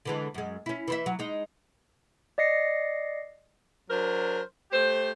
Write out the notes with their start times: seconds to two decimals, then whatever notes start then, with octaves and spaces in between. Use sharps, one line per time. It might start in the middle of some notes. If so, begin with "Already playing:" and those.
0.05 D3 E3 G#3
0.34 F#2 G#3
0.66 C#4 E4
0.88 E3 E4 E5
1.06 F#3
1.19 G#3 D#4
2.38 D5 D#5 A#6 C7 C#7
3.91 F#3 D4 A#4 C5
4.71 A3 G4 C5